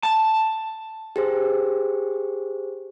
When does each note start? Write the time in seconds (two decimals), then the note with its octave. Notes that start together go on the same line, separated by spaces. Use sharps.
0.03 A5
1.16 G4 G#4 C5